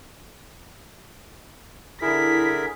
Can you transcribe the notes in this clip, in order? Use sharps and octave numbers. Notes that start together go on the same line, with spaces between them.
D3 E4 G#4 A#4 B6